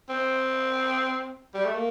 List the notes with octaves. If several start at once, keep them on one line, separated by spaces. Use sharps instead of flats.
C4
G3
A3
A#3